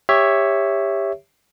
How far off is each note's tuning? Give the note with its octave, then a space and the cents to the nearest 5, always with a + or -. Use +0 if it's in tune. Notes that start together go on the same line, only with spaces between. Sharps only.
G4 +20 C#5 +0 E5 +0